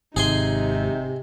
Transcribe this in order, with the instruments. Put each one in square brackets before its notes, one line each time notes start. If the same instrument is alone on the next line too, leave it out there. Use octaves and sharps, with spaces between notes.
[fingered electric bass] G#1 [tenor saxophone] C3 [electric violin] D#4 [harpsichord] G#4 G#5 C6